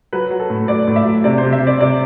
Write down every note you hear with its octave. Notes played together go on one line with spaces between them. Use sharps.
F#3 B4
F#3
A4
A2
F#3 D5
A2
E5
F#3
C3 D5
C5
C3
E5
C3
D5
C3 D5